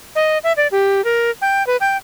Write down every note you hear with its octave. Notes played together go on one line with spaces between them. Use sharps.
D#5
E5
D5
G4
A#4
G5
B4
G5